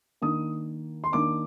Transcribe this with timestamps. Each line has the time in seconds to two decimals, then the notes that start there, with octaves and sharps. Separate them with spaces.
0.22 D#3 A#3 D4 D#6
1.04 C6
1.12 D#3 A#3 D4 D6